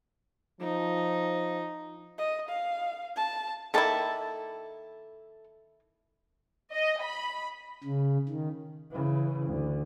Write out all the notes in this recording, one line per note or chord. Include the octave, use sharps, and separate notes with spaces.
F3 D#4
D#5
F5
A5
D#3 A#3 E4 A4 A5
D#5
B5
C#3
D#3
C#3 E3
D2